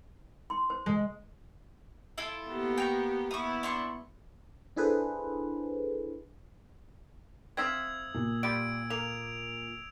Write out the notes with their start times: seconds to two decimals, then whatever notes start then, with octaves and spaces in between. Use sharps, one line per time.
0.50 C6
0.70 C5
0.86 G#3
2.18 E4 F4 A4
2.47 A#3 B3 G4
2.78 G5 A#5 C#6
3.31 B3 E4 C#6 D#6
3.63 D4 C6 C#6
4.76 D4 E4 G#4 A4 B4 C5
7.57 C4 E5 F5 D#6 E6 G#6
8.14 A#2
8.43 G3 F4 G4 D7
8.90 A#3 F7